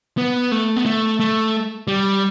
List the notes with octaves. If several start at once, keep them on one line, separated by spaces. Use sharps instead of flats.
B3
A3
B3
A3
A3
G3